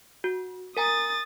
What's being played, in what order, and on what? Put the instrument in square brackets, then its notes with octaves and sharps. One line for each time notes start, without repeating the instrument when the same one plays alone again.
[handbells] F#4
[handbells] A#4 G#5 A#5 [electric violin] D#6 A6